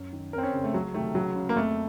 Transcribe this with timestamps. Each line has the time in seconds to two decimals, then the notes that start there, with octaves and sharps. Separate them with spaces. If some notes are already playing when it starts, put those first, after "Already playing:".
Already playing: F#2
0.13 D#3
0.33 F2 A#4
0.38 C4
0.43 C#4
0.53 C#3
0.64 A3
0.74 C#2 F#3
0.94 C3 D#3 A3
1.15 C#2 F#3
1.36 C#3
1.49 A#3
1.55 F2 A3